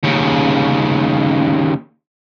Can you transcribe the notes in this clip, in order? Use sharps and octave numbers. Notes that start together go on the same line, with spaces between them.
D#2 C#3